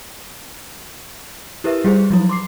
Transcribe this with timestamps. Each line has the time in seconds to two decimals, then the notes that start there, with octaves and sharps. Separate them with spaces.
1.64 E4 G4 A#4 B4 E5
1.84 G3 G4 G#4 C5
2.10 F3 F#3 E4
2.29 C6 D6 C7